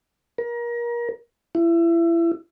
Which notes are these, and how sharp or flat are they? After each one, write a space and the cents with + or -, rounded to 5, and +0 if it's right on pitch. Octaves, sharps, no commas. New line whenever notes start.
A#4 +30
E4 +30